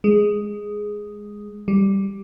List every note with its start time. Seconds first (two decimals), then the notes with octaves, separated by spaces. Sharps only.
0.04 G#3
1.68 G3